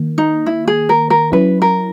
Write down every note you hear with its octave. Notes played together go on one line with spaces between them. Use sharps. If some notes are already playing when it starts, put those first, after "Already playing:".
Already playing: D#3 A#3
D#4
E4
G#4
A#4
A#4
F#3 C#4 E4 B4
A#4